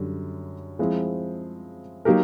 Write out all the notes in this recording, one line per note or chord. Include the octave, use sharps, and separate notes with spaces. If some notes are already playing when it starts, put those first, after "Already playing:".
Already playing: F#2 D3 G3
F3 G#3 C4 E4
F#3 A#3 D#4 G4 A#4